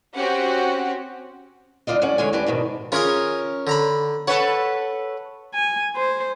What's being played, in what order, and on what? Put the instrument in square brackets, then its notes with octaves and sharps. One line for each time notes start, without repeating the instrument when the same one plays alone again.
[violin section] C4 C#4 F#4 G4 F#5
[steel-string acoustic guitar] D2 D#3 F4 D5 D#5
E2 F#3 G3 C#4 D5 F#5
E2 D3 G#3 C#5 G#5
D2 E3 D4 G4 G#5
F2 G#2 B2 D#3
[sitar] C#4 A#4 [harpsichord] F4 G#4 D#5
[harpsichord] D3 A#5 B5
[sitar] A4 B4 C#5 [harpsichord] F#5
[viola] G#5
C5